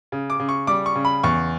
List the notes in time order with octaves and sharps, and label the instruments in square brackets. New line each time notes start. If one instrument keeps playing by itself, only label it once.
[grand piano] C#3
D6
C#3
C#6
G3 D6
C#6
C#3
B5
E2 C#6